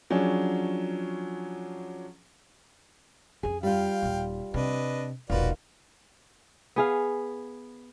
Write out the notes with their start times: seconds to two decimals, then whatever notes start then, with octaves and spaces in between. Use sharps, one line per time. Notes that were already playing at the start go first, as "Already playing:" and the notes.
0.10 F3 F#3 C#4 D4 G#4
3.43 F2 C#4 G#4
3.63 G3 F4 F5 G5
4.02 D#1 D#4
4.54 C3 D4 B4 D#5
5.30 E1 A#1 A#3 D#4 F4 F#4 B4 D5
6.76 B3 G#4 F5